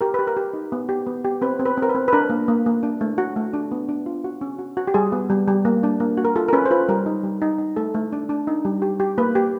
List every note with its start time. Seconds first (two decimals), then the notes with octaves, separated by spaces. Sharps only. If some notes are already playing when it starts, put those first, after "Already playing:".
0.01 G4 A#4
0.14 G4 B4
0.27 A#4
0.36 G4
0.54 D#4
0.72 B3
0.89 G4
1.06 B3
1.25 G4
1.42 C4 B4
1.59 C4
1.66 B4
1.77 C4
1.82 A#4
1.89 B4
1.95 C4
2.08 B4
2.13 D4 A#4
2.30 A#3
2.48 A#3
2.66 A#3
2.83 D4
3.01 A3
3.18 F#4
3.36 A3
3.53 D4
3.72 B3
3.89 D4
4.06 F4
4.24 F#4
4.41 C#4
4.59 F#4
4.77 F#4
4.88 G4
4.94 G3 G#4
5.12 B3
5.30 G3
5.48 G3
5.65 A#3
5.83 D4
6.00 A#3
6.17 F#4
6.25 A#4
6.36 F4 A4
6.48 A#4
6.53 C#4 B4
6.66 C5
6.71 F4 B4
6.89 G3 A#4
7.06 D#4
7.23 G3
7.42 D#4
7.59 D#4
7.76 A3 A4
7.94 A3
8.13 D4
8.29 D4
8.47 D#4
8.65 G3
8.82 G4
9.00 G4
9.18 A#3 B4
9.35 G4